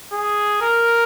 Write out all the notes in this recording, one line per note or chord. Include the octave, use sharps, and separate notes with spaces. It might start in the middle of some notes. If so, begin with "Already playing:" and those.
G#4
A#4